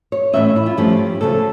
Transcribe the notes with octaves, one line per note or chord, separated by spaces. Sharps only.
C#5
A2 E3 A#3 C#4 E5
E4
F4
G2 F3 A3 C#4 G4
D2 C#3 F3 A3 C#4 A4